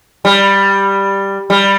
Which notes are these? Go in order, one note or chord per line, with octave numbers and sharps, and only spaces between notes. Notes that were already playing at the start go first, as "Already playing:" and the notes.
G3
G3